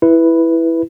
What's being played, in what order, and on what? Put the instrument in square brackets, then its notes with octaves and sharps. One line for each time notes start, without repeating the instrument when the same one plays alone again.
[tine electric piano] E4 B4